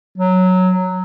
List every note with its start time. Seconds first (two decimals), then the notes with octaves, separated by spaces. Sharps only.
0.18 F#3